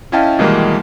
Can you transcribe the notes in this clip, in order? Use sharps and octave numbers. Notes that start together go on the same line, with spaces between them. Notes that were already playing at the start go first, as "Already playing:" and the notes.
C#4 E4 D#5 F5 G5 A5
B2 D#3 E3 G3 G#3 A#3